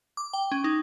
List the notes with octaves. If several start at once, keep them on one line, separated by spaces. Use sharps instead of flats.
D6
G5
C#4
D#4